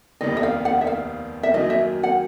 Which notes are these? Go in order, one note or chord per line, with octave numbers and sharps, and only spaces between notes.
F1 D#2 D#3 G3 B3 D#5
E5
F5
F#5
E5
F5
E5
F#2 D#3 F#3 A#3 D#5
E5
F#5